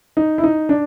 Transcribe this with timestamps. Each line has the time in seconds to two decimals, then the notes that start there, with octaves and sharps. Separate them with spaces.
0.17 D#4
0.38 E4
0.44 D#4
0.69 D4